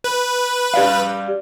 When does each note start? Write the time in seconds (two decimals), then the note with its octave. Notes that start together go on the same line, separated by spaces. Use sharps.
0.04 B4
0.74 G4 D5 F5